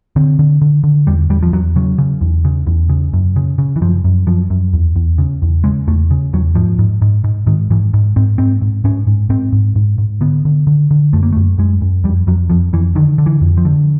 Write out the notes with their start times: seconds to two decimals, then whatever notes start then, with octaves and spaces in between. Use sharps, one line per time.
0.16 D3 C4
0.39 D3
0.61 D3
0.84 D3
1.07 E2 G3
1.30 E2 G3
1.43 F3
1.52 E2 F#3
1.76 C#3 F#3
1.98 C#3
2.21 E2
2.45 C#3
2.67 E2
2.89 C#3
3.13 F#2
3.36 C#3
3.58 C#3
3.76 E3
3.81 F#2 F3
4.04 F#2
4.27 F#2 F3
4.50 F#2
4.73 E2
4.96 E2
5.18 C#3
5.42 E2
5.64 C#3 G#3
5.87 E2 A3
6.11 C#3
6.33 E2 F#3
6.55 G#2 F3
6.79 G#2
7.02 G#2
7.24 G#2
7.47 G#2 D#3
7.70 G#2 E3
7.94 G#2
8.16 G#2 C4
8.38 G#2 C4
8.62 G#2
8.84 G#2 C#4
9.07 G#2
9.29 G#2 C4
9.52 G#2
9.76 G#2
9.98 G#2
10.21 D3 B3
10.45 D3
10.67 D3
10.91 D3
11.13 F#2 A3
11.23 A#3
11.32 A3
11.36 F#2
11.58 F#2 G#3
11.82 F#2
12.04 F2 G3
12.27 F2 F#3
12.50 F2 F3
12.73 F2 E3
12.95 D3 D#3
13.18 D3
13.26 E3
13.41 F2
13.57 F3
13.65 D3